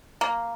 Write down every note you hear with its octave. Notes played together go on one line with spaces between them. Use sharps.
A#3